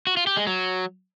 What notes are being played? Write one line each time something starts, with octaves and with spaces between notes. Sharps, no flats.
F#4
F4
G4
G#3
F#3